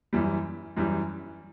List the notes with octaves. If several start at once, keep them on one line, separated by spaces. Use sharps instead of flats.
F#2 E3 G3
F#2 E3 G3